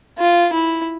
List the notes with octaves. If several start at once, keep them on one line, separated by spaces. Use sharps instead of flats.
F4
E4